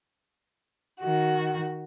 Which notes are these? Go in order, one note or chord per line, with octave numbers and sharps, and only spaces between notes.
D#3 F#4